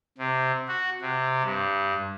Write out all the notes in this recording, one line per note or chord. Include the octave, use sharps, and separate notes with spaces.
C3
F#4
C3
G2